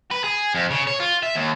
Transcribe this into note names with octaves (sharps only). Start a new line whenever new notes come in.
B4
G#4
F2
C#3
C#5
F4
E5
D#2